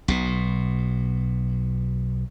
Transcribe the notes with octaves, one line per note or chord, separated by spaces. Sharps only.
B1 B2